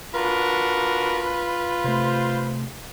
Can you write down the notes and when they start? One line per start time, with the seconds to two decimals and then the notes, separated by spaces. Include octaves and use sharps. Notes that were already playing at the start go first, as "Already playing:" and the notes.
0.14 D4 F4 F#4 A#4 B4
1.84 C3 A3 C5